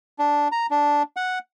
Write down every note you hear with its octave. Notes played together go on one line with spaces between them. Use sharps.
D4
A#5
D4
F#5